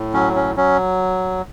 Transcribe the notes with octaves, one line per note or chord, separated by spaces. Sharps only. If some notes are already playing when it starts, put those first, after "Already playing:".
Already playing: A2
F#3 C#4
C#4
F#3 C#4